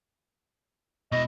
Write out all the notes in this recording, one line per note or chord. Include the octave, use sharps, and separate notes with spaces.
B2 E4 D#5